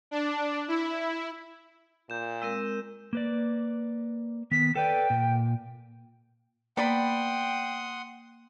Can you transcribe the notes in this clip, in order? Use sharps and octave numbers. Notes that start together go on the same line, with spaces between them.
D4
E4
A#2 G6 E7
G#3 C4 A#4 E6 D#7
A#3 B4 D5
D#3 B3 B6
A4 B4 D5 G5
A#2
A#3 B3 D5 F#5 G5 B5 C6 D#6